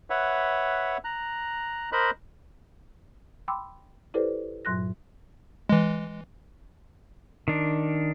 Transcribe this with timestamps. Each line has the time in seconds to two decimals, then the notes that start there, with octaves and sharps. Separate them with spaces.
0.10 B4 C#5 E5 F#5
1.04 A#5 F#6
1.92 A#4 C5 D#5 B5 F#6
3.48 G5 B5 C6 D6 E6
4.14 E4 G4 A4 B4 C5 D5
4.65 G2 A#2 F#3 C6 F#6 A#6
5.69 E3 G#3
7.48 D#3 D4